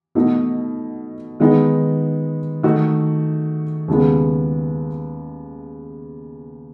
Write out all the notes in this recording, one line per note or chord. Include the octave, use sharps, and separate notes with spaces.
B2 A3 D#4 F#4
D#3 G#3 B3 D#4
D#3 A3 D#4 F#4
D#2 C#3 G#3 B3